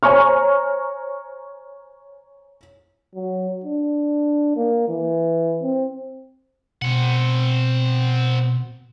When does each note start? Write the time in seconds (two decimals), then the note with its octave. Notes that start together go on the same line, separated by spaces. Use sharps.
0.03 C5 C#5 G#5 A#5 C#6 F6
3.15 F#3
3.64 D4
4.56 A#3
4.89 E3
5.62 C4
6.82 B2 C4 F#5